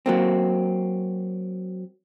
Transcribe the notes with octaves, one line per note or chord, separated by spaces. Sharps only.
F#3 A#3 C4